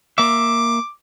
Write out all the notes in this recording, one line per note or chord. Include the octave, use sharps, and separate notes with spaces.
A#3 E5 D6